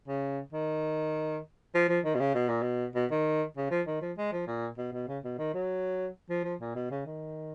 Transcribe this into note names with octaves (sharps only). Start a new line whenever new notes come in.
C#3
D#3
F3
F3
D#3
B2
C#3
B2
A#2
B2
B2
D#3
C#3
F3
D#3
F3
G#3
F3
A#2
B2
B2
C#3
B2
D#3
F#3
F3
F3
A#2
B2
C#3
D#3